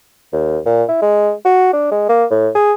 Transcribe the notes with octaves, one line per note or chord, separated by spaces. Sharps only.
D#2
A#2
E4
G#3
F#4
D4
G#3
A#3
A2
G#4